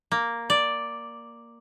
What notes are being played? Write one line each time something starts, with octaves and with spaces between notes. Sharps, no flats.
A#3
D5